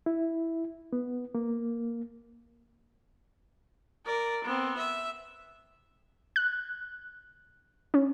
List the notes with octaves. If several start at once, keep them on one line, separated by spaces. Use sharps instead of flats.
E4
B3
A#3
A#4 D5
B3 C4
E5
F#6
C#4